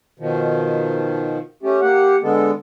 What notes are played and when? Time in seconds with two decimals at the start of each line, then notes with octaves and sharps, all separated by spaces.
0.20 B2 D#3 F3
1.63 A3 C#4 G4
1.81 A#3 G4 F#5
2.23 D3 G#3 B3 A4